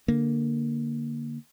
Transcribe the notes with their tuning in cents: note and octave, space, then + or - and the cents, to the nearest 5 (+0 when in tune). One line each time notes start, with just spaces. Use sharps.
D3 +0 A#3 +0